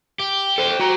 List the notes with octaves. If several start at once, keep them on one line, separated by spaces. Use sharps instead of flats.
G4
A4 C5
F#4 A#5